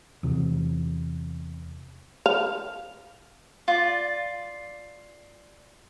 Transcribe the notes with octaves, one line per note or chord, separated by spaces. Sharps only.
E2 C3
F5
F4 D5